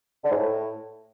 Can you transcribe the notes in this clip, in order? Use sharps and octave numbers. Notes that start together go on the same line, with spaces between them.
D3
G#2
A2